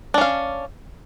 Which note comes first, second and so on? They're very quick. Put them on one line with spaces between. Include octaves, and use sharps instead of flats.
D4 C#4 F5